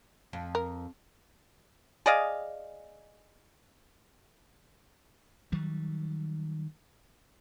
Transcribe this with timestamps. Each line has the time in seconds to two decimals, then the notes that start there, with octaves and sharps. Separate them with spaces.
0.33 F2
0.55 A#4
2.06 G#4 D5 D#5 F5
5.52 D#3 F#3 G3